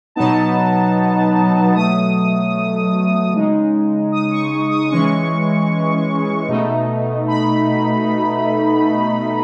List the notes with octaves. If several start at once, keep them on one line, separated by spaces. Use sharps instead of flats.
B2 F#3 B3 D#4 A5
B2 F#3 A3 D#6
C#3 G#3 D#4
D#6
C#6
D#6
E3 G#3 C#4 C#6
B2 A3 D#4
B5